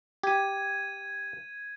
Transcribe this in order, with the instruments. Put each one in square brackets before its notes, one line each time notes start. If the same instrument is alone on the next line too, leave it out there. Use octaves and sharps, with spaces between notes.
[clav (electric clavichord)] G4 [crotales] G#6 D#7